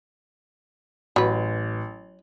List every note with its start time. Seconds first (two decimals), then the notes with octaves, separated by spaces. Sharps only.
1.16 A1 F#3 B4